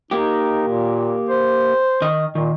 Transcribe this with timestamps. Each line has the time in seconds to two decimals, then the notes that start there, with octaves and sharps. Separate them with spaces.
0.11 A#3 D#4 G4
0.68 A#2
1.29 C5
2.02 D#3 D#5
2.35 A#2 D#3